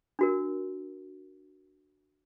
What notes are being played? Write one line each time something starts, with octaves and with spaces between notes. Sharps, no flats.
D4 F#4 A#4